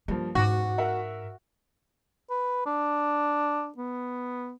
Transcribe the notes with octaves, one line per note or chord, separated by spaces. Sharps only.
G2 F3 A#3
E1 G#2 F#4 D6
A#4 E5 F#5
B4
D4
B3